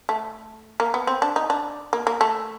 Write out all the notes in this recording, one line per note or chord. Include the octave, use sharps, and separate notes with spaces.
A3
A#3
B3
C4
D4
D#4
D4
A#3
A#3
A3